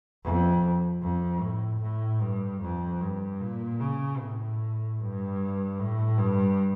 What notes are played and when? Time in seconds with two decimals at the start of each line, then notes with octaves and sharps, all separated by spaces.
0.24 F2
1.02 F2
1.41 A2
1.81 A2
2.21 G2
2.61 F2
3.01 G2
3.40 A#2
3.80 C#3
4.20 A2
4.99 G2
5.79 A2
6.18 G2